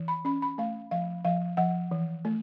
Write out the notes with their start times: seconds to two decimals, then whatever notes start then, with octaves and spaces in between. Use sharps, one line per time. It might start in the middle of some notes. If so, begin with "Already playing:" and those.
Already playing: E3
0.08 B5
0.25 C#4 B5
0.42 B5
0.58 A3 F5
0.91 F3 F5
1.25 F3 F5
1.57 F3 F#5
1.91 E3
2.25 A3